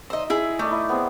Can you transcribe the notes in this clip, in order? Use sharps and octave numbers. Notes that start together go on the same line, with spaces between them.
D#4 C5 D#5 E5 E6
E4 G#4
A3 D#4 D5 D#5
E4
B3 C4 G#4